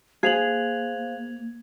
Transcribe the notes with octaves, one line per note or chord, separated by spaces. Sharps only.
A#3 G#4 C5 F5 F#6 G#6 F7 F#7